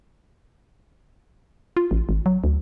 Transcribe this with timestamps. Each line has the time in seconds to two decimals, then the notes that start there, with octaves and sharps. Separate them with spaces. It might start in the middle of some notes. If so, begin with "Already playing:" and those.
1.77 F4
1.91 A1
2.09 G#1
2.26 F#3
2.44 D2